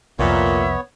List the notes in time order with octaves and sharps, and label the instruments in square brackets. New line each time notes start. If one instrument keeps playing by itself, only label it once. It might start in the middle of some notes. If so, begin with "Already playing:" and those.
[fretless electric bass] C2 F2 [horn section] A#2 [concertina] B3 C#5 [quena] E5